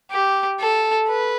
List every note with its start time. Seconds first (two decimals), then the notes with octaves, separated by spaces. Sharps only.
0.11 G4
0.60 A4
1.08 B4